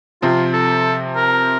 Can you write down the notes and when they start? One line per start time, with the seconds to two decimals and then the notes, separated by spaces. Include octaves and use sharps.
0.22 C3 F3 C4 F4
0.53 A4
1.16 A#4